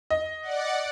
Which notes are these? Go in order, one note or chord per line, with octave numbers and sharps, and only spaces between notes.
D#5
D5 F#5